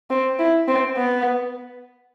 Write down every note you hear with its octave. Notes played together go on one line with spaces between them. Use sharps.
C4
E4
C4
B3